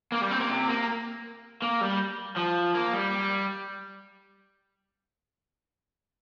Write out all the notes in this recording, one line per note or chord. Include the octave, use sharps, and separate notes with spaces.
A#3
G3
C4
A#3
C3
A#3
A#3
G3
F3
A#3
G3